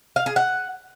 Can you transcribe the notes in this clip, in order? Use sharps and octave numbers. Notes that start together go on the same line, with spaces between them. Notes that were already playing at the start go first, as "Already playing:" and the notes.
F5
G#4
F#5